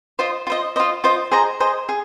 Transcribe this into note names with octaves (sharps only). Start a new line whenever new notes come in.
F4 C5 D#5
F4 C5 D#5
F4 C5 D#5
F4 C5 D#5
G#4 C5 D#5 A#5
G#4 C5 D#5 A#5
G#4